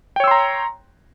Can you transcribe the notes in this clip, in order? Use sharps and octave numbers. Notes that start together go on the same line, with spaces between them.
C#5 G5 A#5 C6 E6